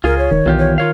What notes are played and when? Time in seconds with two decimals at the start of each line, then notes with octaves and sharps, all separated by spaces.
0.04 C#2 F4 G#4 A#4
0.18 C#5
0.31 E1 D#3
0.46 B1 E2 F4 G4
0.58 C#5
0.78 F4 A#4 C#5 F5